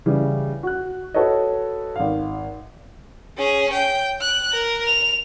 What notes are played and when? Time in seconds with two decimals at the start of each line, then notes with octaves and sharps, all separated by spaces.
0.06 C#3 E3 G3
0.63 F#4 F#6
1.14 F#4 A4 B4 C#5 D#5
1.96 G#1 F5
3.37 C#4 G#4
3.73 G5
4.21 F#6
4.53 A#4
4.87 F7